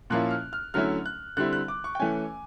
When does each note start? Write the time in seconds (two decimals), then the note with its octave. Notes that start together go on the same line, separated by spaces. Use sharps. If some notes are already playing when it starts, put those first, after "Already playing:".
0.10 A#2 F3 A#3 C#4 E4 F#6
0.31 F6
0.53 F6
0.74 D3 F#3 A3 C#4 E4 F6
1.06 F#6
1.37 D3 G3 C4 E4 F#6
1.53 F#6
1.68 D6
1.84 C#6
1.95 G5
2.00 E3 A3 C#4 G#5